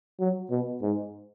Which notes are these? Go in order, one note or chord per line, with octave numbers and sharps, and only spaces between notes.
F#3
B2
G#2